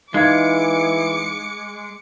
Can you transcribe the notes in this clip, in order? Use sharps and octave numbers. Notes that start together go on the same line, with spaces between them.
E3 G#3 D#4 F5 D6 G#6 C#7